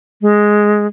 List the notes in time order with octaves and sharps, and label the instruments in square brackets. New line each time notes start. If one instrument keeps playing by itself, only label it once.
[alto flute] G#3